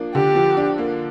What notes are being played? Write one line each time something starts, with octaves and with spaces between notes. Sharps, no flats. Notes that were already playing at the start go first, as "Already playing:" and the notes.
Already playing: F3 A#3 D4
D3 G4
F3
D4
A#3